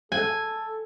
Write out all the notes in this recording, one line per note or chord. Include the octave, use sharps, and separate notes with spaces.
A4 G#5